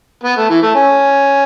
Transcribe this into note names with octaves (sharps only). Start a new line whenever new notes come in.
B3
A3
E3
A3
C#4